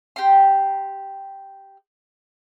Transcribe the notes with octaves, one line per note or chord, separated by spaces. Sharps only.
G4 G5 A#5 C6